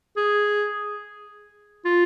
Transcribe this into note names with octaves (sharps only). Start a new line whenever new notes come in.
G#4
F4